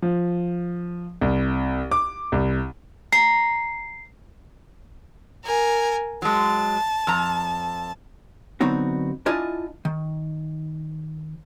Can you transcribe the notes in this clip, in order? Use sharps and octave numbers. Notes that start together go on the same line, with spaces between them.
F3
C2
D6
C2
A#5 C7
A#4 G#5
F#3 G#3 A5
F2 A#5
D3 F#3 B3 C4 D#4 F#4
D4 E4 F4 D#5 G#5 A5
D#3